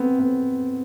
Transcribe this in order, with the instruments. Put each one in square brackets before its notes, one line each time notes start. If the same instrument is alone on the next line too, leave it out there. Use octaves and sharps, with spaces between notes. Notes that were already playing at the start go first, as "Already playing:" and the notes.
Already playing: [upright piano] B3 C4
B3